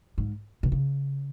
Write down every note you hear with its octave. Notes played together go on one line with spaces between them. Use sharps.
G#2
B2
C#3